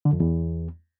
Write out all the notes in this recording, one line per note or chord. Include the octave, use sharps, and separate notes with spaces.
D3
F2
E2